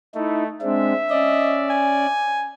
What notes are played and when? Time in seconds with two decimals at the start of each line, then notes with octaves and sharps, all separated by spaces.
0.15 A3 D#4 E4
0.62 G#3 C4 D4 E5
1.11 C#4 D5 D#5
1.70 G#5